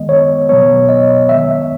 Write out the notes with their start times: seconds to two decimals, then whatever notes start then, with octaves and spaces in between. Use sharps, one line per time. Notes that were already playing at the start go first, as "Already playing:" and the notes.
Already playing: D#3 G#3 B3 D#5
0.09 C#5
0.49 B2 F#3 B3 C#5
0.89 D#5
1.29 D#3 G#3 B3 E5